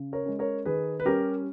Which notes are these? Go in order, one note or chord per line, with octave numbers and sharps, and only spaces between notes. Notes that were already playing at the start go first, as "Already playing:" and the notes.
Already playing: C#3
A#4 C#5
G#3 C#4
A#4 C#5
D#3 G#4 B4
B4
G3 C#4 G4 A#4